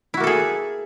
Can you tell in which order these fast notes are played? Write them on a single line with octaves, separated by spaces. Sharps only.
E4 F#4 A#3 A4 G#4